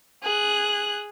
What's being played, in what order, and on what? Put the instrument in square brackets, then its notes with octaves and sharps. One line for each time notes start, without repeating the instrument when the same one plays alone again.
[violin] G#4 F#6